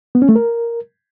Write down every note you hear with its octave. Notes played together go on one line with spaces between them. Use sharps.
B3
C#4
A3
A#4